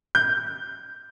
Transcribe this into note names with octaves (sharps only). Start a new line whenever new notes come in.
G6